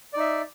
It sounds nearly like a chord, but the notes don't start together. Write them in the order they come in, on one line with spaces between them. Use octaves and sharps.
D5 D#4 E5